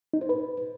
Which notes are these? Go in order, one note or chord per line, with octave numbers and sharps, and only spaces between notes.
D#4
C5
B4